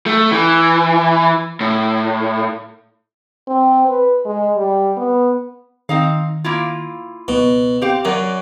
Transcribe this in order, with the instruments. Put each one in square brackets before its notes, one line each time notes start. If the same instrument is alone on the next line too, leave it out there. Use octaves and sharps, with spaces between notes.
[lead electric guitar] A3
E3
A2
[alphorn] C4
B4
G#3
G3
B3
[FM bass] D#3 [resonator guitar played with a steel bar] C4 D#4 F5
[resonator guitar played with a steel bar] A#3 E4 F4
[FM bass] C#2 [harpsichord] B2
[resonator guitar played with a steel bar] C4 G4 F5
[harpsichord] F#2 [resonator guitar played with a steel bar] F#3 D5